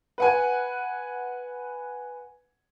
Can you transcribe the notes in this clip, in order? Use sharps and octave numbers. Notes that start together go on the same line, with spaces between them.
B4 F#5 G#5